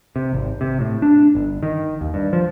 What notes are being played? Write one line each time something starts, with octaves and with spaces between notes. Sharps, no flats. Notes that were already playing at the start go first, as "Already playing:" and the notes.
C3
G#1
C3
A2
D4
G1
D#3
D#2
G2
F3